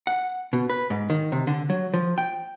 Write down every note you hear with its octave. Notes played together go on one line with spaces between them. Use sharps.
F#5
B2
B4
G#2
D#3
C3
D3
F#3
F3
G5